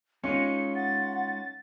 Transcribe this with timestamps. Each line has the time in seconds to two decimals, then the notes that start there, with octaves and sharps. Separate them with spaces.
0.24 G#3 C#4 D#4 F4 C#7
0.75 F#5 A6